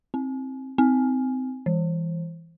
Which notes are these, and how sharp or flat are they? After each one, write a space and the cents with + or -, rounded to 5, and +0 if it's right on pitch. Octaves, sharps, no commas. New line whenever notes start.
C4 +15
C4 -20
E3 +10